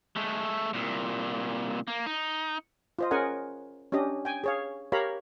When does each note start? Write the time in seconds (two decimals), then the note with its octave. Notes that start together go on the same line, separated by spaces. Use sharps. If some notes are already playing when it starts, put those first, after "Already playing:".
0.16 G#3 A3
0.74 C2 A#2
1.88 A#3
2.06 D#4
2.99 F4 C5 D#5
3.11 C#4 G#4 A#4 D#5 F#5 G#5
3.92 C#4 D4 G4 D#5
4.25 G5 G#5
4.44 G#4 C#5 F5
4.92 G4 A#4 C#5 F5 A#5 B5